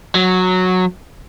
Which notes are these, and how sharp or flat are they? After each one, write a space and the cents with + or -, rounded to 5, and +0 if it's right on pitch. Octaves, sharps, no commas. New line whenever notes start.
F#3 -10